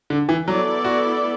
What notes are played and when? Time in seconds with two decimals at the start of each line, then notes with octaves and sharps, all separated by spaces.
0.10 D3
0.29 E3
0.48 F#3 B3 E4 A4 D5
0.84 F#4